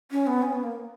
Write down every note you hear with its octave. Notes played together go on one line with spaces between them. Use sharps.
C#4
B3
C#4
B3
A#3